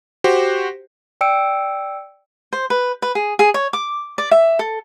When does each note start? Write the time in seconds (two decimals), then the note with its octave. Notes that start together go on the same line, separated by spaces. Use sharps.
0.24 F#4 G4 C5
1.21 D5 G5 E6 C#7 D7
2.53 C5
2.70 B4
3.02 B4
3.15 G#4
3.39 G#4
3.54 C#5
3.73 D6
4.18 D5
4.31 E5
4.59 A4